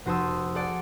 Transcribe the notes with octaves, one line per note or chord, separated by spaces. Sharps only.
F1 F#4 C5 A5 D#6 E6
G#4 A4 D5 F#5